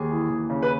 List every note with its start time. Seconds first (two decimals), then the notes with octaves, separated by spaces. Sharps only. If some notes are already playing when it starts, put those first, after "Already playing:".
Already playing: D#2 G#4
0.10 E3
0.29 D#2
0.50 C#3
0.63 B4